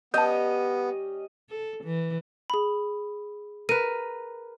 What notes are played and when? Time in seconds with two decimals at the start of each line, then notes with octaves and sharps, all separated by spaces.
0.14 G3 B3 C#4 G4 D#5 A5 G6
1.49 A4
1.84 E3
2.50 G#4 B5
3.69 A#4 B4 D#7